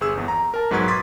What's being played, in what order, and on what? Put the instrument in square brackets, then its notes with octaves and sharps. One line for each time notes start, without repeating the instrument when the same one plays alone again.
[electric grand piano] G1 G#4 E6
G1 E2
A#5
A#4 A5
B1 G#2 F#3 B4 C#6 G#6
C6 D6 D#6 G#6 A6 B6